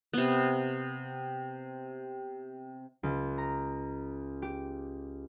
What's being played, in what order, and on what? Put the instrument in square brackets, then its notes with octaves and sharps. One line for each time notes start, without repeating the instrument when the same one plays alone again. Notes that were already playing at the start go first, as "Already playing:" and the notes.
[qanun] C3 B3
[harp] C#2
A#5
G4